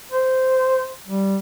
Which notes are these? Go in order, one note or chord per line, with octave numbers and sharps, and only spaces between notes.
C5
G3